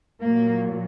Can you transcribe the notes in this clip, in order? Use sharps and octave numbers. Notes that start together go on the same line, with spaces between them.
A#2 F#3 A#3